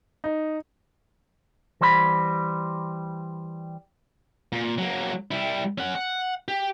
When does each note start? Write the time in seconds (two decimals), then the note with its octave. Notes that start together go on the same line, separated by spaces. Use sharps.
0.24 D#4
1.81 E3 G3 C5 D#5 B5
4.52 A#2
4.78 F#3 A#3
5.31 G3 E4
5.78 C#4 F#5
5.95 F#5
6.48 G4